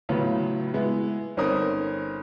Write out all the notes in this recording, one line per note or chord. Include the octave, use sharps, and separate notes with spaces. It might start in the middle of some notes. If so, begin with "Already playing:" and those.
A2 C#3 F#3 B3 F4
G#3 B3 E4
G1 C4 C#4 D#4 A#4 D#6